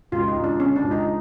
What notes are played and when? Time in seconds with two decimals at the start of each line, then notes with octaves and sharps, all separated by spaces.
0.12 C#2 F4
0.28 D#4
0.36 C#2
0.44 D4
0.59 C#3 C#4
0.76 D4
0.84 C#2
0.91 D#4